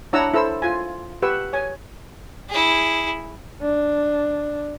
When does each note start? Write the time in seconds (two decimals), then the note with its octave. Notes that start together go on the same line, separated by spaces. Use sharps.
0.13 D4 E4 C#5 F#5 A#5 E6
0.34 E4 A4 C5 E6
0.62 F4 G#5
1.22 G4 B4 F#5 C#6 E6
1.53 C#5 G#5
2.50 E4 G#4
3.62 D4